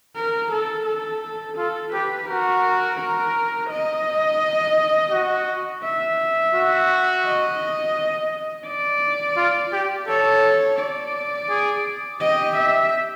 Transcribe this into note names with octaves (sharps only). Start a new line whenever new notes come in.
A#4
A4
A4
F4 A4
G4 B4
F#4 A#4
A#4
D#5
F#4
E5
F#4
D#5
D5
F4
G4
A4 C#5
D5
G#4
G4 D#5
E5